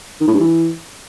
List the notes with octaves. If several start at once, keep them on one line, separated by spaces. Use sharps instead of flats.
D#3
A2
G2
E3